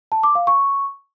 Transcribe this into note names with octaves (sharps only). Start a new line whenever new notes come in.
A5
D6
F5
C#6